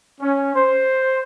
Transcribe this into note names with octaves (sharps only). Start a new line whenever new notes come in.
C#4
C5